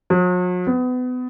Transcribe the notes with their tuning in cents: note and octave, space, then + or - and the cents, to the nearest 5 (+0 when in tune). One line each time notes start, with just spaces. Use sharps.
F#3 -45
B3 +30